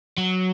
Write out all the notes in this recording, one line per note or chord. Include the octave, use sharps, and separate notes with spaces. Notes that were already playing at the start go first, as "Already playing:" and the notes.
F#3